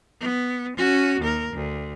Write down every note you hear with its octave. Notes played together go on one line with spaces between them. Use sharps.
B3
C#4 F#4
D#2 A#4
D2